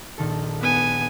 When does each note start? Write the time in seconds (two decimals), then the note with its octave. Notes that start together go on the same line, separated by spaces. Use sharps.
0.18 A#1 D#3 A4
0.61 B3 F#5 G#5